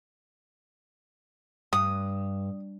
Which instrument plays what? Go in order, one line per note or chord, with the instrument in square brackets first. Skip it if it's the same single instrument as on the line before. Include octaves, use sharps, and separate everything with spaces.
[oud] G2 [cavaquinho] D#6